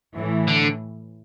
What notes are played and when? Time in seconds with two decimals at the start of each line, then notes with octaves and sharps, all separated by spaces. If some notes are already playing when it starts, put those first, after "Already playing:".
0.15 A2 E3 A3
0.48 D3